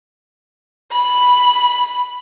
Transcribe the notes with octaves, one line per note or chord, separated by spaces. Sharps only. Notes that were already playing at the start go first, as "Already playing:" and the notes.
B5